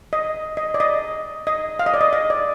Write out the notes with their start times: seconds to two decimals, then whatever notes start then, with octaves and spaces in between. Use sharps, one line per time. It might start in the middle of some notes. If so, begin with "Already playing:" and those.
0.13 D#5
0.57 D#5
0.74 D5
0.80 D#5
1.47 D#5
1.79 F5
1.86 D#5
1.94 D5
2.01 D#5
2.13 D#5
2.30 D5